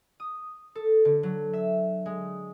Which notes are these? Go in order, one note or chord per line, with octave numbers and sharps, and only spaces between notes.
D#6
A4
D3
F#3
E5
G#3